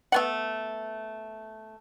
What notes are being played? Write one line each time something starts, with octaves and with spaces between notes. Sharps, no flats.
A3 B3 F#5